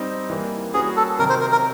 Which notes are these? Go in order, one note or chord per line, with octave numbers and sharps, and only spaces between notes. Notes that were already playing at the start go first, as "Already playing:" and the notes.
Already playing: G3 C4 D#4
E3 G3 A#3
G3 A#3 C#4 F#4 G#4 B4
A4
C3 D#3 F#3 A#4
C5
A#4
A#4